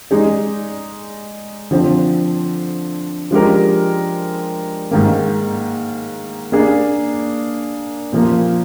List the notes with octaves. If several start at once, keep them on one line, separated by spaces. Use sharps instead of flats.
G#3 D#4 G#4 D5
D3 F3 C4
F3 G#3 D4 G4 A#4
G#2 D#3 A#3
A#3 D4 G#4
A#2 F3 A#3 F4